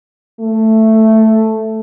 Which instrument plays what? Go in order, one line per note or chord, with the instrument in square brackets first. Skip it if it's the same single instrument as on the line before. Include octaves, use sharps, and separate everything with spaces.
[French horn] A3